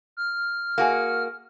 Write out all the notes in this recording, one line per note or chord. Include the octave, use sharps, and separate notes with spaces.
F6
A#3 F#4 G#4